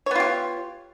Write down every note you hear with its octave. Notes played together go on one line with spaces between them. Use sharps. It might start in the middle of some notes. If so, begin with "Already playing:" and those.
B3 F4 G4 C#5